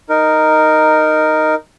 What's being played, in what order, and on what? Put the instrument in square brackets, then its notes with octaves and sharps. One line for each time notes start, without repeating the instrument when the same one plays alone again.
[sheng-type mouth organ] D#4 A#4